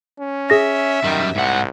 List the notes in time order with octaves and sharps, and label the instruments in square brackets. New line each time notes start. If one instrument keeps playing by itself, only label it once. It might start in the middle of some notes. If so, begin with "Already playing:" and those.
[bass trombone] C#4
[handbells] G#4 A#6 [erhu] E5
[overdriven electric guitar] F#2 G3 [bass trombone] D#3
[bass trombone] C2 [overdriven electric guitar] G#2 F#5